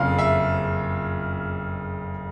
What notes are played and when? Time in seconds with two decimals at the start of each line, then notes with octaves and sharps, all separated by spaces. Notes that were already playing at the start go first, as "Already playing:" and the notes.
Already playing: F#1 F2 C#3 F5
0.19 E5